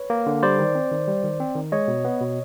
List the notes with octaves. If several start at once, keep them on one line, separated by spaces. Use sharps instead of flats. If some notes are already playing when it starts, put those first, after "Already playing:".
Already playing: B4 C#5
A#3
D3
G3 C5 D5
D#3
C4
D#3
G3
D#3
C4
D#3
G#3 C#5 D#5
B2
B3
B2